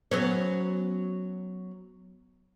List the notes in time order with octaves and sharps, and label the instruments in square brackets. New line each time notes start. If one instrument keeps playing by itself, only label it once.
[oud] F#3 B3 C#4